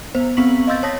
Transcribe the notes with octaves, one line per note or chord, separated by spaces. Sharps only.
B3 C5
B3 C4 C#6 B6 F#7
D#5 F5 C6 E6 G6 A6
C#5 A5 D#6 A#6 B6